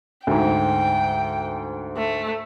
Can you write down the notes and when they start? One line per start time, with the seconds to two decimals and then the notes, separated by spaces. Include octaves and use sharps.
0.27 D2 G#2 G5
1.97 A3